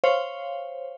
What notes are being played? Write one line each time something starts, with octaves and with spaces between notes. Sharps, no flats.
C5 C#5 F5